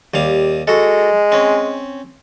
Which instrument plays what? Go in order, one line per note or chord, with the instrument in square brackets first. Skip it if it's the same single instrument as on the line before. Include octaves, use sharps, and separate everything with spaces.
[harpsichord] D#2 G3 F5
[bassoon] G#3 [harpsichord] F#4 A4
[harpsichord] C4 C#4